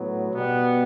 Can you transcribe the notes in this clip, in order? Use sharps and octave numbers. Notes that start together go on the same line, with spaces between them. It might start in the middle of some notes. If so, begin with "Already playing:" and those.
Already playing: A2 F#3 B3
B2 G3 B3